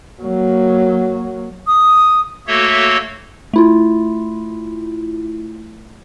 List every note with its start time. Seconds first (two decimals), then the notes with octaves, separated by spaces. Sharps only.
0.21 F#3 A#3
1.67 D#6
2.47 A3 A#3 F#4 A4 C#5 E5
3.54 A3 E4 F4